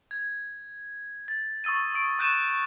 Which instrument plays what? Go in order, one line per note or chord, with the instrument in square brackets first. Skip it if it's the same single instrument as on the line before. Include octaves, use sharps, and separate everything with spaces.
[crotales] G#6
A6
C#6 D#6 E6 A6 D#7
D#6 D7
C#6 F#6 G6 A6 D#7 E7